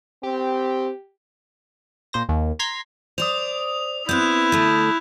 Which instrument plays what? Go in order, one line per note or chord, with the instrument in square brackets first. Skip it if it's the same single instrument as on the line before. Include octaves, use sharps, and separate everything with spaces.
[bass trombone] C4 [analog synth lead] G4
[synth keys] A#2 C5 A#6
D#2
A#5 C6 G#6 B6
[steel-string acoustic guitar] C5 D5 [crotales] D#6 F7
[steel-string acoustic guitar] B3 C4 [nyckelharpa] E4 [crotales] F#6 G6
[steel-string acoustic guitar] D3 A3